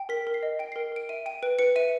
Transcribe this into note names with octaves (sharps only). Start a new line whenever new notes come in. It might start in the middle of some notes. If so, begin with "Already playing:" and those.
Already playing: G5
A#4 B6
A#4
C7
D#5
G5 D7
A#4 C7
A#4 D7
E5 D#7
G5 D#7
B4 D7
B4 C#7
E5 D#7